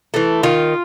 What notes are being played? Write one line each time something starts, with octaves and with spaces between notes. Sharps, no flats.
E3 A3
D#3 F4